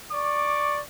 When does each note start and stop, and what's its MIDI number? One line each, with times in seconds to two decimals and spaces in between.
0.12 0.79 74
0.12 0.79 85
0.12 0.79 86